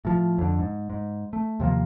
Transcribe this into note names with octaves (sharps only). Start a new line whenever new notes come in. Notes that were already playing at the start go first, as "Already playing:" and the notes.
A2 F3
F2 D3
G#2
G#2
A3
D#2 C3 F3 A#3